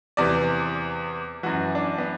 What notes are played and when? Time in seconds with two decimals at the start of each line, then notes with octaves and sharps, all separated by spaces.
0.17 E2 C3 E3 D5
1.43 F#2 E3 F#4
1.75 D4
1.98 B3